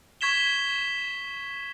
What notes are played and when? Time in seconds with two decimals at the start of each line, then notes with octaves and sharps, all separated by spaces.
0.21 C#6 G#6 B6 E7 G7